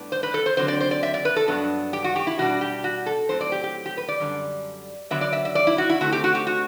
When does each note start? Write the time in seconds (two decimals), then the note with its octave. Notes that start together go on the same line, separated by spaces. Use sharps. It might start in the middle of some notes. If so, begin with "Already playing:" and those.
Already playing: A2 G3 B3 D4
0.12 C5
0.23 B4
0.34 A4
0.46 C5
0.57 D3 F#3 C4 C5
0.68 D5
0.80 C5
0.91 D5
1.03 E5
1.14 D5
1.25 B4
1.36 A4
1.47 G2 F#3 B3 D4
1.93 G4
2.04 F#4
2.16 G4
2.27 E4
2.38 B2 G3 D4 F#4
2.61 G4
2.84 F#4
3.06 A4
3.29 A2 F#3 C4 C5
3.41 D5
3.52 G4
3.64 G4
3.86 G4
3.97 B4
4.08 D5
4.20 F#2 D3 G3
5.11 D3 F#3 B3 D4 E5
5.21 D5
5.33 E5
5.45 E5
5.55 D5
5.67 E4
5.78 F#4
5.90 E4
6.01 D3 A3 C4 F#4
6.12 G4
6.24 F#4
6.35 G4
6.47 F#4